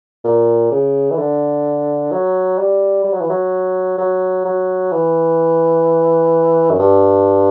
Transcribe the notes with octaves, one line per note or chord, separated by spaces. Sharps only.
A#2
C#3
E3
D3
F#3
G3
G3
F#3
E3
F#3
F#3
F#3
E3
F#2
G2